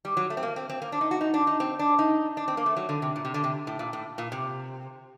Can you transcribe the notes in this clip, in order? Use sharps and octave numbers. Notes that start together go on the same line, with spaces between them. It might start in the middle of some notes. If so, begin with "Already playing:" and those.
G3
F#3
A3
C4
A#3
C4
C4
A#3
D4
D#4
F#4
D#4
D4
D#4
C4
D4
D#4
D4
C4
A#3
A3
F#3
D3
C3
A#2
C3
D3
C3
A2
A#2
A2
A#2
C3